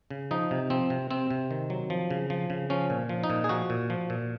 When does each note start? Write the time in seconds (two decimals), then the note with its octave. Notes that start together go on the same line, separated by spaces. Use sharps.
0.10 C#3
0.31 F3 D#4
0.51 C3
0.70 F3 C4
0.90 C3
1.11 C3 C4
1.30 C3
1.51 D#3
1.70 F#3
1.90 F3
2.10 C#3
2.30 F3
2.50 C#3
2.70 F3 C#4
2.90 A#2
3.09 F3
3.24 D#4
3.30 A#2
3.44 G#4
3.49 F3 F#4
3.70 A#2
3.90 F3
4.10 A#2